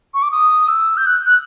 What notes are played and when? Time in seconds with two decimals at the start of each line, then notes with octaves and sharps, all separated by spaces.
0.14 C#6
0.22 D6
0.31 D#6
0.68 E6
0.97 G6
1.07 F#6
1.26 F#6